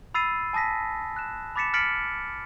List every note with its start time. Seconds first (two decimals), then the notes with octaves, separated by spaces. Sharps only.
0.14 B5 E6 A6 C7 D#7
0.53 G#5 A5 D#6 A#6 B6
1.16 F#6 E7
1.56 B5 D6 A6 B6 C#7 E7
1.74 F6 A6 B6 C#7 D7 F#7